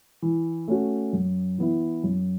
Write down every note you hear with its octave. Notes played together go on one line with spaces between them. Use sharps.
E3
A3 C#4 F#4
F#2
E3 B3 E4
F#2